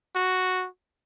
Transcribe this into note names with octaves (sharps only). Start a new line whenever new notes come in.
F#4